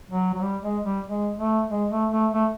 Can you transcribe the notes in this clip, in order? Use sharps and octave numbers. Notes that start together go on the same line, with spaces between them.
F#3
F#3
G3
G#3
G3
G#3
A3
G#3
A3
A3
A3